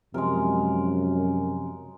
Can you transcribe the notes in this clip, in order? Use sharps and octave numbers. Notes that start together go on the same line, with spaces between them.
F#2 C3 F3 G#3 A#4